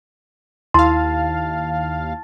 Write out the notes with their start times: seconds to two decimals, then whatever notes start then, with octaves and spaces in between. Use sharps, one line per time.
0.74 D#2 E4 F5 A5 C6 A6